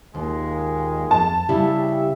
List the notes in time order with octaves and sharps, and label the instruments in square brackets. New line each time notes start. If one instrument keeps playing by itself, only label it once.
[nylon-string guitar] D#2 [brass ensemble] A#2 D#3 G#3
[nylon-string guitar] F2 [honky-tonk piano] A5
[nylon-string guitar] C#3 G3 E4 [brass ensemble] G4 E5